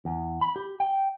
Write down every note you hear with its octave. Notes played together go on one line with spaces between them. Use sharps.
E2
B5
G4
G5